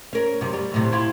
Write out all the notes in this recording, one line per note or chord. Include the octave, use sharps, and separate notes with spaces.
C#4 A#4
F#2 C3
G3
F#2 A2 C3
E4 F4 G4